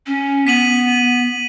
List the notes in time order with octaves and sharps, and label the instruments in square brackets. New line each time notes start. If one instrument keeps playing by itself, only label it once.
[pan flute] C#4
[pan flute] B3 [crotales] B6 D#7 F#7